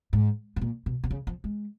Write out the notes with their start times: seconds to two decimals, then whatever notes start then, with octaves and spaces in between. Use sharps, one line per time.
0.13 G#2
0.56 G#2
0.61 A#2
0.86 B2
1.04 B2
1.11 C#3
1.27 F3
1.44 G#3